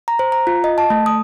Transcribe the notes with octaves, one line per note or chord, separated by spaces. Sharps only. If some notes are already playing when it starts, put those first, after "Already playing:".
A#5
C5
A#5
F4
D#5
A5
A3
D#6